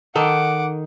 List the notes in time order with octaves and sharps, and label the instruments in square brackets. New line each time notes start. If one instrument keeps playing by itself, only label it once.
[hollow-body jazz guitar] D#3 D#4 A4 [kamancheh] F#5 D6